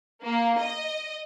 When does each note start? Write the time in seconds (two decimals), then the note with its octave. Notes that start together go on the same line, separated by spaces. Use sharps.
0.23 A#3
0.58 D#5